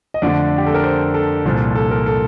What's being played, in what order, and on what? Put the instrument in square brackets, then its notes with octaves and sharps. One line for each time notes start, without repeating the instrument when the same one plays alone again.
[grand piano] D#5
F2 D3 A3 D4 D5
G4
A4
A#4
C5
A4
C2 A#2 F3
A4
A#4
A4